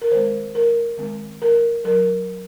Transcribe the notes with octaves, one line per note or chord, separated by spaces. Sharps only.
A#4
D#3 G#3 C4 C5
A#4
D#3 G#3 C4
A#4
F#3 A#4